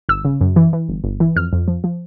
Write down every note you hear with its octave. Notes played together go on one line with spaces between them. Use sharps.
G1 E6
C#3
F#2
E3
E3
G1
G1
E3
F2 F6
F2
F3
F3